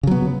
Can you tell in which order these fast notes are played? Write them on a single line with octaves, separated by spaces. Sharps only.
C#3 F#3 B3